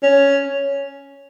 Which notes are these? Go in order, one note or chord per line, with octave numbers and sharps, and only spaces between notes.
C#4